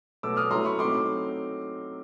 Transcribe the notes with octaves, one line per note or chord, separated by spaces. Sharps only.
B2 F#3 A3 D6 E6
D#6 F6
F#3 A3 C#4 E4 A#5 C6
B5 C#6
F#3 A3 C4 D#4 C6 D6